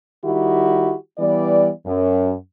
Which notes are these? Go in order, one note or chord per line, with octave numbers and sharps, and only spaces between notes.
D#3 G3 E4 F#4 G4
E3 G3 B3 D5
F#2